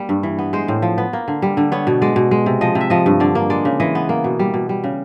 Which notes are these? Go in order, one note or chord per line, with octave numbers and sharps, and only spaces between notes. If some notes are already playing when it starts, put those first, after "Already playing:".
Already playing: G3 A#3
G2
E3
B3
G#3 C5
A2
F3
B3
A#3
D3
G3
D3
B3 C#5
B2
G#3 D5
B2
G#3
C3
F3 D#5
C3
E5
F3 D#5
G2
D3 D5
A#3
G#3 D5
C#3
E3 D#5
B3
A#3
B2
G3
B2
G3
C#3